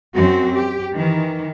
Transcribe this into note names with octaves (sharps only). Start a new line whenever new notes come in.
F#2 C4 F#4
G4
D#3 E3